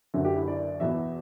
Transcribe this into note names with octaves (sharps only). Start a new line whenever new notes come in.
F#1 F#2 D3 E5
G4
E4
D5
E2 B2 F#3 B3 E5